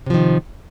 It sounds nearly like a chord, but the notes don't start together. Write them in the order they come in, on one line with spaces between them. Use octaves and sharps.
C3 F3 D#3